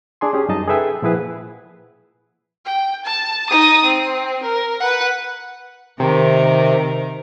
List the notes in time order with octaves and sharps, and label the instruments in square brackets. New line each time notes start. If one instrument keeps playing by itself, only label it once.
[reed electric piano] D4 G#4 G#5 C6
C#4 G4 G#4
F#2 G3 D#4 D#5 A5
G#4 A4 B4 E5 G5 G#5
A#2 F3 E4 G#4 B4 F#5
[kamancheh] G5
A5
D#4 D#6
C4
A#4
B4 F#5
[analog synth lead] C3 [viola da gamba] D#3 A#4